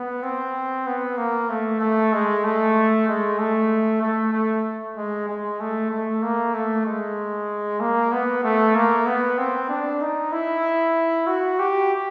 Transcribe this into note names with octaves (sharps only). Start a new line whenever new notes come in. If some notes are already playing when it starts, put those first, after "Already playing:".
Already playing: B3
C4
B3
A#3
A3
A3
G#3
A3
G#3
A3
A3
A3
G#3
G#3
A3
A3
A#3
A3
G#3
A#3
B3
A3
A#3
B3
C4
D4
D#4
E4
F#4
G4